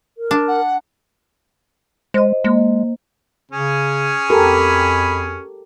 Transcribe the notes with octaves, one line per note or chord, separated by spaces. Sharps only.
A#4
D4
F#5
G#3 C5 D#5
G#3 A#3
C#3 C#4 G#4
F2 G4 A4 A#4 B5